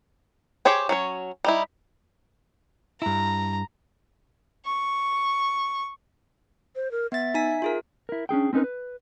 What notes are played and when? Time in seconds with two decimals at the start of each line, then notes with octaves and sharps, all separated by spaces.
0.65 G4 G#4 C5 C#5 G5
0.89 F#3 C#4 C#5
1.44 G3 D#4 E4
3.02 G2 E4 A#5
4.65 C#6
6.76 C5
6.91 A#4
7.12 B3 E5 A6
7.34 D#4 G#5 B6
7.62 F4 G#4 A#4
8.09 E4 A#4
8.29 C#4 D4 G#4 G5
8.53 C4 C#4 D#4 A#4 B4
8.64 B4